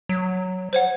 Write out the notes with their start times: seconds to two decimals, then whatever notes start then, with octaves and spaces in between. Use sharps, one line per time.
0.09 F#3
0.73 C5 C#5 F#5